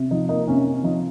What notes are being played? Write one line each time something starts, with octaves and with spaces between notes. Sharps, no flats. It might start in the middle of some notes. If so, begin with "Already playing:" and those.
Already playing: C3
F3 D#4
A#3 D#4
C3 C#4
C3
F3 D#4